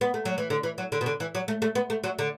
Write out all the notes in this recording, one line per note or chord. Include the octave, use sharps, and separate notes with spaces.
B3
A3
F#3
E3
D3
E3
F#3
D3
B2
D3
E3
F#3
A3
A3
B3
A3
F#3
D3